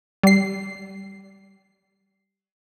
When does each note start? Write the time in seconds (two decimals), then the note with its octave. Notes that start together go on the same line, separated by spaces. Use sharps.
0.23 G3 C7